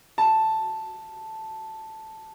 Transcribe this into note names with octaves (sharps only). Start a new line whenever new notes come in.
A5